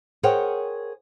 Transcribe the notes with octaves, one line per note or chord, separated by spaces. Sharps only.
G#4 A#4 C5 C#5 F#5 G5